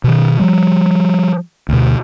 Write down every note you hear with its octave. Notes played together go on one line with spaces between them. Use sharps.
B2 D#3
F3 G3
D2 B2